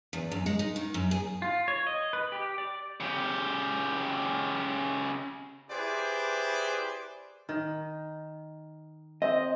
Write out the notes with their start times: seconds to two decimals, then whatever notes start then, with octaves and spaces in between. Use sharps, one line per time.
0.13 E2
0.31 F#2
0.46 G#3
0.59 D#4
0.76 D#3
0.94 F#2
1.11 G#4
1.42 F4
1.68 C#5
1.87 D#5
2.13 B4
2.32 G4
2.58 D5
3.00 C#3 G4
5.70 E4 G4 G#4 B4 C5 D5
7.49 D#3
9.22 C4 D#5